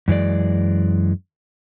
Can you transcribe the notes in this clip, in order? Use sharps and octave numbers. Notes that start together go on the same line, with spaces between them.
F#2 E3 G#3 D5